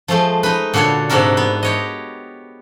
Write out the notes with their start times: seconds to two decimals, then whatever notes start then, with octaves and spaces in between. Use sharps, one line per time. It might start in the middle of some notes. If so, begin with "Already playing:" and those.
0.08 F3 G#3 A3 C5
0.43 D#4 B4
0.74 A#2 D3 F#4 A4 C#5
1.10 G#2 C3 D4 F#4 A#4 E5
1.37 B3
1.63 G4 C#5 D#5